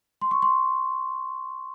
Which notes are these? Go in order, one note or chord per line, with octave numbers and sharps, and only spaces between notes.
C6
C#6
C6